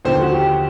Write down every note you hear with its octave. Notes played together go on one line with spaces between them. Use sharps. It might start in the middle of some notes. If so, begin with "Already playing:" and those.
D#2 D3 F3 C5
F#4
G4